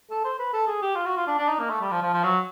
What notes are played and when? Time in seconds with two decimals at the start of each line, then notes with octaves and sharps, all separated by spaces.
0.10 A4
0.24 C5
0.39 B4
0.53 A4
0.67 G#4
0.82 G4
0.95 F4
1.06 F#4
1.17 F4
1.27 D4
1.38 D4
1.49 D#4
1.59 A#3
1.70 A3
1.81 G3
1.91 F3
2.02 F3
2.13 F3
2.24 F#3